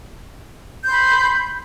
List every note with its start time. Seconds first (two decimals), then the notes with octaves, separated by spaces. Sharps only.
0.83 G6
0.87 C6
0.92 B5